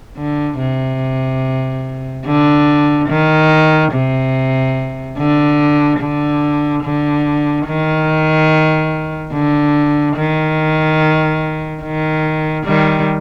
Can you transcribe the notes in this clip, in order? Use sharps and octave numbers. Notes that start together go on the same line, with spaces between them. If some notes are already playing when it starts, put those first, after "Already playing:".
D3
C3
D3
D#3
C3
D3
D3
D3
D#3
D3
D#3
D#3
D#3 G3